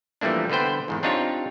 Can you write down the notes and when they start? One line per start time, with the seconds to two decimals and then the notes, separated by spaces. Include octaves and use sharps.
0.21 E3 F3 G3 A3 A#3 D4
0.50 D3 B3 B4 C5 G5
0.88 E2 G#2 D#3
1.03 C4 D4 D#4 F4 G4 C#5